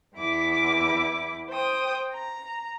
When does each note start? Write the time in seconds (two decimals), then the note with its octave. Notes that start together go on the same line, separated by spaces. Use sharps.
0.16 E2 E4 D6
1.50 C5 G5 D#6
2.13 A#5